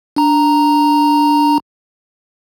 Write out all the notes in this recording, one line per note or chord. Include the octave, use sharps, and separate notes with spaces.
D4 A#5